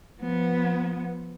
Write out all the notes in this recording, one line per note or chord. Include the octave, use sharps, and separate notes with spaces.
F3 B3